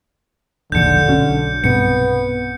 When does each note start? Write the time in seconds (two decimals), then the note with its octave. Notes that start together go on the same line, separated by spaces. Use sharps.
0.72 E1 A#1 D#2 D3 G6 C#7
1.08 B1 F#3 C#4
1.64 B1 G2 C3 B3 C#7